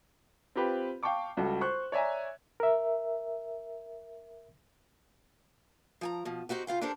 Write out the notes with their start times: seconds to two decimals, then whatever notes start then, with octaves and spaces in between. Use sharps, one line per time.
0.55 C4 F4 G4 B4
1.03 F5 G5 A5 C#6 D6
1.37 C#2 G3 F#4 A4
1.61 C5 C#6 F#6
1.92 C#5 D5 E5 G#5 A#5
2.60 A#4 E5
6.01 F3 G#5 A#5
6.25 B2 F3
6.49 C4 D#4 F#4 G4
6.67 C#3 F4 F5 G5
6.81 D4 G4 A4 A#4 C5 D5